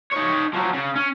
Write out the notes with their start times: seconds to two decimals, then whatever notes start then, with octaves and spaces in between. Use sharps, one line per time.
0.12 D#4 C#5
0.53 F3 F#3
0.73 C#3
0.96 C#4